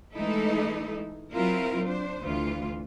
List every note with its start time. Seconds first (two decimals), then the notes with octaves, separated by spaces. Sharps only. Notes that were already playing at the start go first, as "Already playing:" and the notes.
0.13 E3 G#3 A3 D#4 E4 A4
1.33 F#3 C4 E4 F4 A#4
1.84 D4 C5
2.23 D2 E3 F4